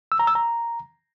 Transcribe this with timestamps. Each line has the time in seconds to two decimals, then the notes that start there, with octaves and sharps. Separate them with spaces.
0.12 E6
0.19 A#5
0.27 E6
0.35 A#5